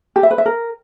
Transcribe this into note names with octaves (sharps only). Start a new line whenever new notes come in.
G4
E5
B4
E5
A#4